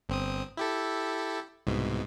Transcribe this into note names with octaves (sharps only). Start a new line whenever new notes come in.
G1 C4 D#6
E4 G4 A4
C2 G#2 B2